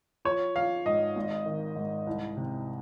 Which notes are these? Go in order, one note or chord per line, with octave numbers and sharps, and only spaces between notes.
F3 C#5
F3 F5
G#2 D#5
G#1
D#3
G#2
C2
C3